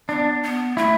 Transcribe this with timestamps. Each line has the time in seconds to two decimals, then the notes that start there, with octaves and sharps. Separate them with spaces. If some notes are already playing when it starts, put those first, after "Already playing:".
0.09 B3 D4
0.43 B3
0.77 A3 E4